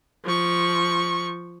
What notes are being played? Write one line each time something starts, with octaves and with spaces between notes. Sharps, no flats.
F3 C#6